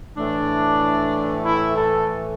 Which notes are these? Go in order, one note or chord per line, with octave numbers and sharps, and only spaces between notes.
A2 E3 A3 D4
E4
A4